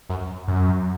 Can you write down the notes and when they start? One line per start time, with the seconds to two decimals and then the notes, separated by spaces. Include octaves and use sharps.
0.09 F#2
0.48 F#2